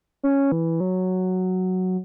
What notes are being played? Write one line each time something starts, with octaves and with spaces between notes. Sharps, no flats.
C#4
E3
F#3